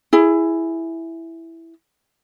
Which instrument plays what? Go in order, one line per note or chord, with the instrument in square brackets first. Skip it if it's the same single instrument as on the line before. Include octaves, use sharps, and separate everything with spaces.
[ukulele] E4 G#4